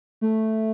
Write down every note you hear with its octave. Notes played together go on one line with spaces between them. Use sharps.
A3